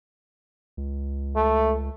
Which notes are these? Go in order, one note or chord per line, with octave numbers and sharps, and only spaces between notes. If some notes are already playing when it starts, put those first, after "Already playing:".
C#2
A3